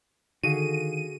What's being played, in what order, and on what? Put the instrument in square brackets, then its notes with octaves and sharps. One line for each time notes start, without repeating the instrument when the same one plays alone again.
[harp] D3 F5 [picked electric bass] D#3 [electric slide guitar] F#4 G#4 [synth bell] D#7